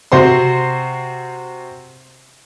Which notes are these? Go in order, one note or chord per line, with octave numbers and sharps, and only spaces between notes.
C3 F#4 C5 C6